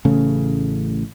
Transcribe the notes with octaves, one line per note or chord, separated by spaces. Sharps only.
A1 C#3 A3